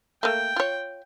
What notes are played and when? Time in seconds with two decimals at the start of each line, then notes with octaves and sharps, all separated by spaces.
0.23 A3 A#3 G5
0.56 F4 C#5